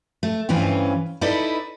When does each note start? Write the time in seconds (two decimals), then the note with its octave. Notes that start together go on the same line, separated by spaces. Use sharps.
0.23 A3
0.49 G2 E3 C4 C#4 F4
1.21 D#4 E4 A4 B4 D5 D#5